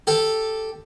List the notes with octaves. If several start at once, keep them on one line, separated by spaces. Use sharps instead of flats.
G4 A4